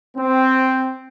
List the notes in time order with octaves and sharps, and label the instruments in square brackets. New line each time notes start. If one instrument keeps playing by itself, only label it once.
[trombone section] C4